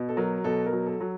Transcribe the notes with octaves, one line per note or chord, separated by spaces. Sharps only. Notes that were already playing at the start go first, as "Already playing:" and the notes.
Already playing: B2
A4
F#3 A#4
B2 A4
A#4
F#3
A4
F#3